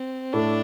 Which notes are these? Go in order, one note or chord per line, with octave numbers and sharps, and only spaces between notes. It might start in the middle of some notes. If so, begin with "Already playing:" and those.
Already playing: C4
A2 A3 D4